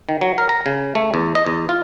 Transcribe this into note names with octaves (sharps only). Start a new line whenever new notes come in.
D#3
F#3
A#4
A#5
C#3
A3
E2
D#5
E2
F4